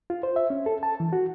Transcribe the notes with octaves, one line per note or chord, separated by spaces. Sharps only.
F4
C5
E5
C#4
A4
A5
E3
F#4